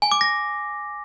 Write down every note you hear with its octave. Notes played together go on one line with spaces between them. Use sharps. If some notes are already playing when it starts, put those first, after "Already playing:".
G#5
D6
A#6